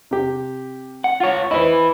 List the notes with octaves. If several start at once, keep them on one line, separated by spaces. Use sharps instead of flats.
C3 G4
F#5
F4 C#5
E4 B4 C5 D#5